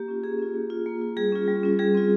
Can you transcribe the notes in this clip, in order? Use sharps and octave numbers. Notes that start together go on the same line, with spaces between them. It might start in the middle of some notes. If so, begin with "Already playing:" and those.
Already playing: A#3 G4
C#4 F4
A#3 G#4
C#4 F4
A#3
F4
A#3
F4
G3 G#4
C#4 F4
G3
C#4 F4
G3 G#4
C4 F4